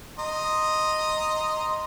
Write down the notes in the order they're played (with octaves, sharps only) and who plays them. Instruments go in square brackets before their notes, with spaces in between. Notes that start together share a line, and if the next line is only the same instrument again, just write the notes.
[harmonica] D#5 A#5 C6